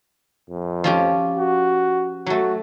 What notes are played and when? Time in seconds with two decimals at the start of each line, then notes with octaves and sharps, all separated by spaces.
0.50 F2
0.84 F3 C#4 G4
1.38 F#4
2.26 F#3 A3 F#4